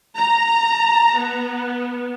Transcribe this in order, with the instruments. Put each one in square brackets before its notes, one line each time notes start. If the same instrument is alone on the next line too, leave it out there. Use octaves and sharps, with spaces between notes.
[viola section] A#5
B3